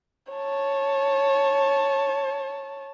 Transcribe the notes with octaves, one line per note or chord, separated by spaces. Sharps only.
C#5 A5